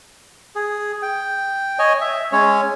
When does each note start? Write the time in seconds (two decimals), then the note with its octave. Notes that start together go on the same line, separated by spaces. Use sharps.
0.55 G#4
1.02 G5
1.79 C#5 D#5 G#5
2.01 E5
2.32 G#3 C#4 C#5